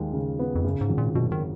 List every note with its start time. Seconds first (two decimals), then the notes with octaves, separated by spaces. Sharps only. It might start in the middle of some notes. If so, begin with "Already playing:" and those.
Already playing: D#2 G#3 F4
0.13 C#3
0.39 B3
0.55 F2
0.64 F#2 C#3
0.81 G#2
0.89 G#1
0.98 A#2
1.15 F#2 B2
1.32 D#3